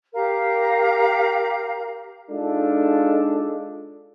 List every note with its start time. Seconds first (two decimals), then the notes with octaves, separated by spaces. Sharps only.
0.13 G4 A#4 F5 A#5
2.30 G#3 D4 D#4 F4 A4